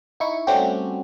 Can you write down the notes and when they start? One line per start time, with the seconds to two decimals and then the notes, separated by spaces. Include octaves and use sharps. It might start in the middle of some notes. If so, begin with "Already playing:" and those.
0.20 D#4 E4 C#6
0.47 G3 A3 C4 C#4 F#4 G4